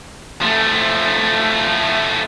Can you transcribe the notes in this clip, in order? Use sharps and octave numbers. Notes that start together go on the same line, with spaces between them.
F3 A3